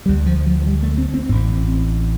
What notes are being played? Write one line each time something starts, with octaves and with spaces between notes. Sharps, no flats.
D2 D3 G3
F3
F3
F3
G3
A3
C4
C4
A1 A2 C4